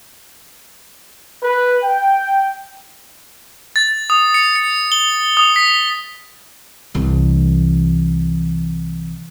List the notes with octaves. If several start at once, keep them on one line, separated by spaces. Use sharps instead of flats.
B4
G5
A6
D#6
C#7
C#7
G7
D#6
B6
C2 E3